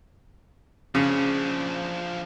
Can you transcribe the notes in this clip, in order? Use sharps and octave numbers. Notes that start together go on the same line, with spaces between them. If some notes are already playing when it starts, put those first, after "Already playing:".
C#3 F3 D4